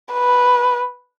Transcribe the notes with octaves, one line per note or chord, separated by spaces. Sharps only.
B4